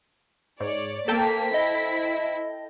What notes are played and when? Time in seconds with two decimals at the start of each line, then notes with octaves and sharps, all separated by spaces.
0.60 G#2 C#5 D5
1.08 A#3 A4 C5 G5 A5 B6
1.54 E4 D#5